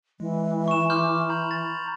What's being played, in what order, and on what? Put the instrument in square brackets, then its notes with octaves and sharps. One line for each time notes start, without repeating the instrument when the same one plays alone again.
[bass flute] E3 [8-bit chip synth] G#3
[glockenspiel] C#6 E7
[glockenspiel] C6 F6 G6 [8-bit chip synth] D6
[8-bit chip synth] A#5 B5 G6
[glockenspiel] A6